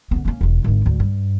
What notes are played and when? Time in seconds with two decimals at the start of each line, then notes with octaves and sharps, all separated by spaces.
0.11 D3 B3
0.25 A#3 C#4
0.41 E1 D#2
0.64 G#1 D3
0.86 D2 G#2
1.00 G2